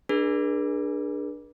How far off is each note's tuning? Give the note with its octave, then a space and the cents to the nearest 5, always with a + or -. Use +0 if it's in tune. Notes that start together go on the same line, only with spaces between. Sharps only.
D4 +15 G#4 +0 B4 -45